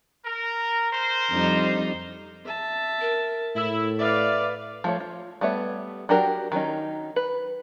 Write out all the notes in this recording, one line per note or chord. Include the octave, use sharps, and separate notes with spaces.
A#4
A#4 C5
F2 G3 D#4
E5 A5
A#4
A2 E4
B4 D5 E5 F5
F3 A3 C#5
F4
G3 A3 B3 C#5 E5
F#3 D4 F#4 G4 A#4
D#3 F#3 C#4 D#4
B4